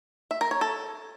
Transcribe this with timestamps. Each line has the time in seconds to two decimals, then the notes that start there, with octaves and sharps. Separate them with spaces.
0.31 E5
0.41 A#4
0.51 C#5
0.61 A4